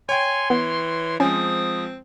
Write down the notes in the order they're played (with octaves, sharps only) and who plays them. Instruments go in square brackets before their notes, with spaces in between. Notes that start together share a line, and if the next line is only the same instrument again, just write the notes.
[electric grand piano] C#5 G5 [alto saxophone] G#5 [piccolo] C6
[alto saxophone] E3 [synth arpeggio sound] B3
[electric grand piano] F3 G#3 [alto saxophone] C4 [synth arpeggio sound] C#4 G#5 [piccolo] D#6